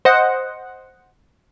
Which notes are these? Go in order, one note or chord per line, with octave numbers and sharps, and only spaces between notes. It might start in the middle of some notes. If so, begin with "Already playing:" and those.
C5 D#5 F#5